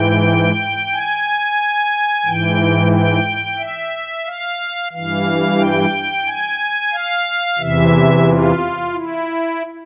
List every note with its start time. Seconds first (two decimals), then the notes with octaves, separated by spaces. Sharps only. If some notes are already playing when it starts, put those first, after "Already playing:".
Already playing: G#2 E3 G5
0.92 G#5
2.26 G#2 E3 G5
2.92 G5
3.58 E5
4.26 F5
4.92 G2 E3 F5
5.59 G5
6.26 G#5
6.92 F5
7.59 E2 C3 E3 E5
8.26 F4
8.92 E4